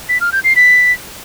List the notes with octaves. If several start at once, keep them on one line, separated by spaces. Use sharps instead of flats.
B6
F6
G6
C7
B6